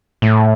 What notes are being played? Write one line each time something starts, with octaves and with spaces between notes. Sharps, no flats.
A2